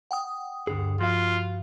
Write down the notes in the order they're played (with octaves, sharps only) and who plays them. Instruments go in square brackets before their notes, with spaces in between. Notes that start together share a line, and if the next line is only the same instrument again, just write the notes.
[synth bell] F#5 G5 D#6
[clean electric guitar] D2 D3 G#4 [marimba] G2
[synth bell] F3 [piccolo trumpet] F4 [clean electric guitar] F#4 F5